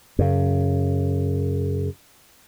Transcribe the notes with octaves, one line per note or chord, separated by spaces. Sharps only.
F#2 C#3